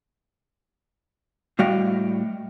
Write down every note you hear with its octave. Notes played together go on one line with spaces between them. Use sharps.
A2 G3 F#4 D#5 F5 G5